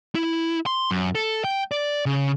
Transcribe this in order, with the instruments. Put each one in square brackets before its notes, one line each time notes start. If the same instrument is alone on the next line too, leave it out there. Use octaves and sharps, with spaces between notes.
[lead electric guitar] E4
C6
F#2
A4
G5
D5
C#3